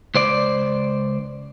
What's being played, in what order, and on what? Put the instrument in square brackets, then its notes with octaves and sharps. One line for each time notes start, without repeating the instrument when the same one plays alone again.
[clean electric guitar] C#2 C5 D5